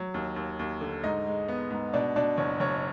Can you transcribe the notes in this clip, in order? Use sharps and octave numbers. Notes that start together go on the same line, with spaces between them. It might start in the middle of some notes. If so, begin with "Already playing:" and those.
Already playing: F#3
D#2
D#2
D#2
D3
G#2 D#4 D#5
G#3
B3
G#2
B2 D4 D5
B2 D4 D5
F#1 C#5
F#1 C#5